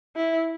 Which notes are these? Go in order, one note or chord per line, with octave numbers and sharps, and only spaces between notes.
E4